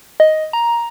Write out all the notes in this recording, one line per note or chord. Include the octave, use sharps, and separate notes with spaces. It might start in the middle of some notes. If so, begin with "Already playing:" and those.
D#5
A#5